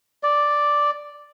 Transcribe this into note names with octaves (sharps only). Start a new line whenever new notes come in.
D5